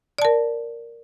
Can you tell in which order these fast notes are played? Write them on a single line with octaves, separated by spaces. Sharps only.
D5 A5 A#4